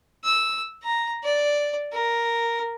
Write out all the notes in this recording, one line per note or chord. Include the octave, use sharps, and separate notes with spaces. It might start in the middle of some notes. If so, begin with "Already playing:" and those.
E6
A#5
D5
A#4